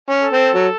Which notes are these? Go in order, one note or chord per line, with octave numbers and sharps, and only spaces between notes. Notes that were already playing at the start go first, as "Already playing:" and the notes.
C#4
A4
C4
F#3